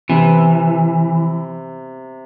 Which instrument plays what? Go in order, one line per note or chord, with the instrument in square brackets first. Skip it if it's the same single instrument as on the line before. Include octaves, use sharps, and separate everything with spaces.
[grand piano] C3 [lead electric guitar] E3